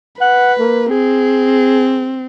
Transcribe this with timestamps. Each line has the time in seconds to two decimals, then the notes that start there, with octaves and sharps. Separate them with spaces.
0.21 B4 F#5
0.59 A#3
0.91 C4 G#4